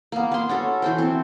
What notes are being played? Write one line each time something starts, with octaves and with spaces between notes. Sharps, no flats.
A#3 B3
B3 C6
C#4 F#4 A4
E3 A4 C5
C4